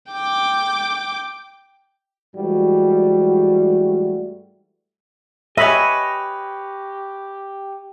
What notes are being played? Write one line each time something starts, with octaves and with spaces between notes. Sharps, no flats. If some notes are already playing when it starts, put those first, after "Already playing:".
G5 D6
G#2 E3 G3 A3 F#4
G4 B4 C#5 D#5 E5 G#5 B5